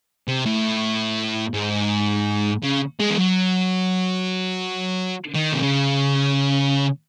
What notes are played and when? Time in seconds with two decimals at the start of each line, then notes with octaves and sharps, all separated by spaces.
0.28 C3
0.46 A2
1.54 G#2
2.63 C#3
3.00 G#3
3.10 E3
3.18 F#3
5.35 D#3
5.53 C3
5.63 C#3